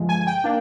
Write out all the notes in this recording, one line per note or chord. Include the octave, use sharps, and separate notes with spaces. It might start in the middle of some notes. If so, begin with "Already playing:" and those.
Already playing: G2 D3 F3 G#3
G#5
G5
A#3 D4